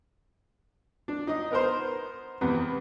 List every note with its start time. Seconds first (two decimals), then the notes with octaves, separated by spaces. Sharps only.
1.08 D4
1.27 D#4 D#5
1.51 B3 A#4 C5
2.41 E2 C3 B3